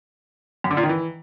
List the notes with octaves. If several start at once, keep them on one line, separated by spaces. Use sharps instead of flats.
F#2
D3
A#2
D#3
E3